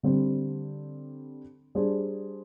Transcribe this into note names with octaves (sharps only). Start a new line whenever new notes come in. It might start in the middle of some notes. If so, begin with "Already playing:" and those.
D3 G3 C4
G3 D4 G#4 C5